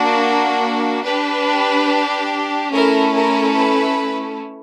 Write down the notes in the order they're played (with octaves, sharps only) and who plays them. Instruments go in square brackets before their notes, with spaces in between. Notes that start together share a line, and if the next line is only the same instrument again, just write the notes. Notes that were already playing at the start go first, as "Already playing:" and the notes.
Already playing: [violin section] A#3 D4 F#4
D4 G4 B4
A3 C#4 E4 A4 A#4
A#4
B4